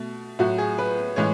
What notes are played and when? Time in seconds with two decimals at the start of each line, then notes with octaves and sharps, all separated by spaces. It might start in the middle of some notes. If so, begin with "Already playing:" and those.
Already playing: B2 A3
0.39 A2 F#3 A3 F#4
0.58 G#4
0.78 B4
1.16 A2 E3 G#3 C#5